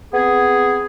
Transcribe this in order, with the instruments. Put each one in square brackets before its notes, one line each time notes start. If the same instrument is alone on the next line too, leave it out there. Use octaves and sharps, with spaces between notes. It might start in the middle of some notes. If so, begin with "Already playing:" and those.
[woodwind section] B3 C4 G#4